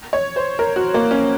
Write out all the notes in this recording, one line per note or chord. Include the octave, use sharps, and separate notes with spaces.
C#5
C5
A#4
F#4
A#3
C#4